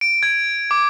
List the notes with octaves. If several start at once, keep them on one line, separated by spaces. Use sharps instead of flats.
D7
G#6
D6